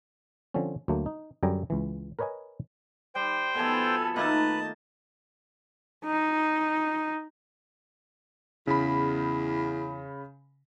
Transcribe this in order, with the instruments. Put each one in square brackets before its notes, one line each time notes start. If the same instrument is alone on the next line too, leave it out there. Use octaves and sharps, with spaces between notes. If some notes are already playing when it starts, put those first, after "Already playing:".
[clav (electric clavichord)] D3 F3 C4 C#4
D2 F#3 A3 A#3
D#4
F#2 D3 G3 G5 G#5 A#5
C#2 E3
A#4 B4 C#5 D#5 G#5
[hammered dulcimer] G3 [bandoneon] C5 G5
[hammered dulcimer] B2 F3 [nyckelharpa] B3 G#5 [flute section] A4
[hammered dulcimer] D#3 A3 A#3 [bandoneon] B4 F#6 [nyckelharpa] D#5 A5
[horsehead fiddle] D#4
[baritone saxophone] E2 [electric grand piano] C#3 B5